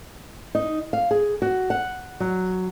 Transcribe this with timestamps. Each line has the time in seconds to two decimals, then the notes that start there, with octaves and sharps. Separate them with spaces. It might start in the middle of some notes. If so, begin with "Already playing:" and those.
0.55 D#4
0.93 F5
1.11 G#4
1.42 F#4
1.70 F#5
2.20 F#3